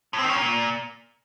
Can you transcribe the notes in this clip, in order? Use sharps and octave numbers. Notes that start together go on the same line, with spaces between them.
A2
C4
D#3
C#4
A#2